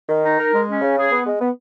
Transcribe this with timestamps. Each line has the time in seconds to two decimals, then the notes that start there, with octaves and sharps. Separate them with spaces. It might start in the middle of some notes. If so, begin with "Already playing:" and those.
0.09 D#3
0.24 D#4
0.38 A#4
0.53 G#3
0.67 C#4
0.82 C#3
0.96 G#4
1.11 B3
1.25 G#3
1.40 B3